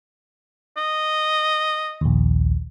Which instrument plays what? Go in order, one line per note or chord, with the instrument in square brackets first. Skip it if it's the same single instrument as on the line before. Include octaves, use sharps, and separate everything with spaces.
[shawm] D#5
[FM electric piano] A#1 D#2